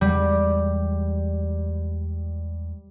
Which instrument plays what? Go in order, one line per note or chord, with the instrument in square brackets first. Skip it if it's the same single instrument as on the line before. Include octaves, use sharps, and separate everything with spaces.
[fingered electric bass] E2 G#3 [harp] G3